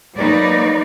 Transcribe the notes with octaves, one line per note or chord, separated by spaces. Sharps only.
F#3 G#3 A#3 D#4 B4 D5